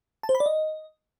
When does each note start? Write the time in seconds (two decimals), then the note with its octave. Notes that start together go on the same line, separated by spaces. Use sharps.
0.23 A5
0.29 C5
0.35 B5
0.40 D5
0.46 D#5